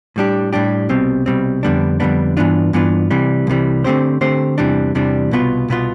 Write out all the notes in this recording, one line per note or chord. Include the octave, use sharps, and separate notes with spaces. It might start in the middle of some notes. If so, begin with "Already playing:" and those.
A2 G3 D4 G4
A2 G3 D4 G4
C2 B2 G3 C4
C2 B2 G3 C4
F2 D3 G3 B3 D4
F2 D3 G3 B3 D4
G2 E3 B3 D4 F4
G2 E3 B3 D4 F4
C2 C3 E3 G3
C2 C3 E3 G3
D3 A3 C4 G4 C5
D3 A3 C4 G4 C5
E2 C3 E3 G3 D4
E2 C3 E3 G3 D4
C2 B2 B3 F4
C2 B2 B3 F4